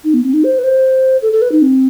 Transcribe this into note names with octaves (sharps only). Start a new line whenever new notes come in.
D#4
B3
C4
D#4
C5
B4
C5
A4
A4
B4
D#4
C4